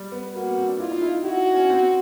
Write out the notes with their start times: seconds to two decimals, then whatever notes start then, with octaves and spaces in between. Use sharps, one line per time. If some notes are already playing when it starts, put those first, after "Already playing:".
Already playing: G3
0.12 B3
0.34 A#3 F#4
0.45 B3
0.58 C4
0.68 D4
0.79 E4 F4
0.91 D#4
1.02 E4
1.24 E4 F#4
1.54 C#4
1.70 C4